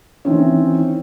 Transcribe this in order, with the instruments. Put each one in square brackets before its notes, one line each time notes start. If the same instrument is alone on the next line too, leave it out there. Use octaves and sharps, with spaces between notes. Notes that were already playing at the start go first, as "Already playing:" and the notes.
[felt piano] D#3 E3 C4 C#4